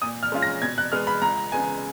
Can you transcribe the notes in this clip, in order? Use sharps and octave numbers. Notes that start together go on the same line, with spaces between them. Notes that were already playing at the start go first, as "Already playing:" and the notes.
A#2 D#6
F6
G#3 C#4 F4
A#6
B2 G#6
F#6
G#3 B3 F6
B5
C#2 A#5
C#3 G#3 B3 G#5